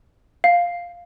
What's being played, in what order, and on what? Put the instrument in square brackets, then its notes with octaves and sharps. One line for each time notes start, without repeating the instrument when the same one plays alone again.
[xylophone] F5